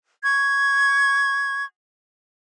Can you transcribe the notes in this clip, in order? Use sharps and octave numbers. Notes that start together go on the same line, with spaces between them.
C#6 G#6